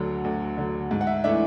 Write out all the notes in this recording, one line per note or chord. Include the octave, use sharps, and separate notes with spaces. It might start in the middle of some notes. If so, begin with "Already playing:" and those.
Already playing: D2 D3 F#3
D2
D3 F#3
G#2
F#5
E5
E3 A3 D4 E5